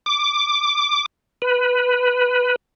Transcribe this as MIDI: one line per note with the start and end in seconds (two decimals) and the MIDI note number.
0.06 1.06 86
1.42 2.56 71